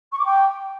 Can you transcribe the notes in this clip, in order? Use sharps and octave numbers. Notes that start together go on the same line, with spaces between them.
C#6
D6
G5